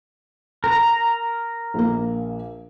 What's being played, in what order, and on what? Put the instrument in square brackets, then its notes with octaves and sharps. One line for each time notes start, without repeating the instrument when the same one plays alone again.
[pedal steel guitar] A#4 A#5
[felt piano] A#1 A#3